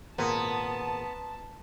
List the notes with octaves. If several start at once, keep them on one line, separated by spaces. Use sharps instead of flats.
G#1 A#2 A#3 B3 A5 A#5 C6 D#6